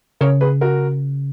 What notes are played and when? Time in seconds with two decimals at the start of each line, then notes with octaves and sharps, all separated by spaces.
0.21 C#3 A#4 C#5
0.41 G#4 B4
0.61 F#4 A#4